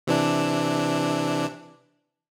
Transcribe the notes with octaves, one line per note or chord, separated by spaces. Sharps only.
C3 E3 D4